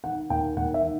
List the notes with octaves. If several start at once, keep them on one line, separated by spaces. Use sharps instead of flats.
D#3 F#5
D#2 G5
D#2 F#5
E5
D#3